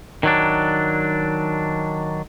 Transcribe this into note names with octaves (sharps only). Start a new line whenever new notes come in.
D#3 F#3 D4